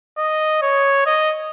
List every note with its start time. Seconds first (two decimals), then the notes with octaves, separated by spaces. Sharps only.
0.18 D#5
0.62 C#5
1.06 D#5